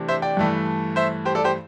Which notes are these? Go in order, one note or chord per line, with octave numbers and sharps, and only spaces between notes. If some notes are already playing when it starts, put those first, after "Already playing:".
Already playing: C3 E3 A3 D4
C5 E5
D5 G5
G2 E3 A3
C5 E5
G4 C5
A4 D5
G4 C5